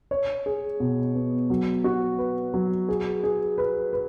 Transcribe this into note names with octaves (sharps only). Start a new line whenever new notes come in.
C#5
G#4
B2
B3
F#3
F#4
B4
F#3
G#4
G#4
B4
B4